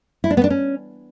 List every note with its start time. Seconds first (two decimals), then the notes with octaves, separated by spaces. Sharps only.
0.24 E4
0.30 D4
0.37 B3
0.44 D4
0.50 C#4